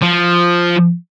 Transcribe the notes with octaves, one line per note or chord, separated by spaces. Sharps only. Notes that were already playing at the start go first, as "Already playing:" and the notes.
F3